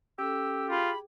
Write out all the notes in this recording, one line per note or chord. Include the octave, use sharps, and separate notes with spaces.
C#4 G4 A4 E6
F4 G#4 B5